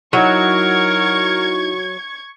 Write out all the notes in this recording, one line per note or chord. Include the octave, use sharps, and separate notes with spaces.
F#3 D#4 E4 A#4 C#6 G#6